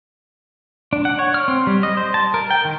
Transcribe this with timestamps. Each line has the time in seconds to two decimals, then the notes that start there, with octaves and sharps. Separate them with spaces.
0.93 D4
1.05 F#5
1.19 C#5
1.34 F6
1.48 C4
1.67 G3
1.83 D#5
1.97 C5
2.14 A5
2.34 A#4
2.51 G5
2.65 D#3